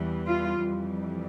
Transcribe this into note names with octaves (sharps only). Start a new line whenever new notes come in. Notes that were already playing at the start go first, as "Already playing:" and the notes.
Already playing: E2 E3 G3
F4
F2 E3 G3